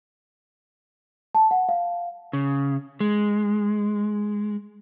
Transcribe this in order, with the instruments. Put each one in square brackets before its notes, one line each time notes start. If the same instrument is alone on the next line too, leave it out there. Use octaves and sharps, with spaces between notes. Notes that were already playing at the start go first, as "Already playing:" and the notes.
[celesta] A5
F#5
F5
[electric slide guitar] C#3
G#3